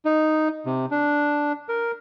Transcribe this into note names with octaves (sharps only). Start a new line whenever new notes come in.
D#4
C3
D4
A#4